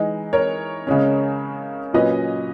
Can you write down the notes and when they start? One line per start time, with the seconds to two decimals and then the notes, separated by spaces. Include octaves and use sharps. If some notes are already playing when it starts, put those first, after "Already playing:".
Already playing: E3 G#3 D#4
0.33 A#4 C#5
0.87 C#3 G#3 C#4
1.93 A#2 F#3 C#4 B4 D#5